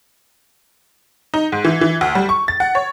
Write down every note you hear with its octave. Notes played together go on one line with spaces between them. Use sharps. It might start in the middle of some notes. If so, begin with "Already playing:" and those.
D#4
G#2
E3
E3
D2
G3
C#6
A6
F#5
C#5